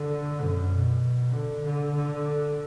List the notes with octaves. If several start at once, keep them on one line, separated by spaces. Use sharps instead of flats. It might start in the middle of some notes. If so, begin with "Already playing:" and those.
Already playing: D3
F#2
B2
D3
D3
D3